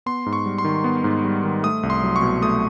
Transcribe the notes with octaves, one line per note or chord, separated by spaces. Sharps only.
B3 C6
G#2
C#6
G3
C6
D#3
B3
G#2
G3
D#3
A3 D#6
C2
C6
F#3
C#6
B2
A3 D#6